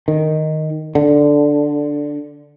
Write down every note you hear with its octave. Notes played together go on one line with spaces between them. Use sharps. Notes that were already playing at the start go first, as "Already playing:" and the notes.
D#3
D3